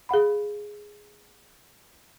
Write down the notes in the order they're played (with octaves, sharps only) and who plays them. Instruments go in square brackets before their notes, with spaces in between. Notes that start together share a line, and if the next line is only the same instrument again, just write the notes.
[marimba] G#4 F5 F#5 B5